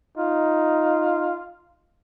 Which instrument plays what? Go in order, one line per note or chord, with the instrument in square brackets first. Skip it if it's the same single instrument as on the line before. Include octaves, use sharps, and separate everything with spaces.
[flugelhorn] D#4 [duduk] F4